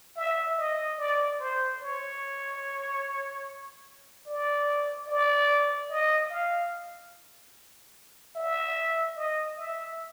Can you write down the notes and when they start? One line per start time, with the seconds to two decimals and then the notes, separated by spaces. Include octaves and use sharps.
0.17 E5
0.58 D#5
0.98 D5
1.39 C5
1.80 C#5
4.26 D5
5.08 D5
5.90 D#5
6.30 F5
8.35 E5
9.16 D#5
9.58 E5